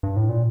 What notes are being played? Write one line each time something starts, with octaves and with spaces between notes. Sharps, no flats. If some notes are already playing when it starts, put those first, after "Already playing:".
G2
A2
A#2